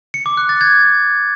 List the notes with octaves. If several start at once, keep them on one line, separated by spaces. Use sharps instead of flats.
C#7
D6
F#6
A6
G#6